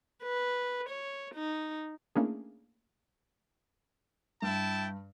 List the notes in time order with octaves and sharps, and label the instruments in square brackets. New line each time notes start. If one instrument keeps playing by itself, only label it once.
[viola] B4
C#5
D#4
[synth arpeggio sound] A3 A#3 C#4 D4 E4 G#4
[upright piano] G2 [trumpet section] E4 G5 A5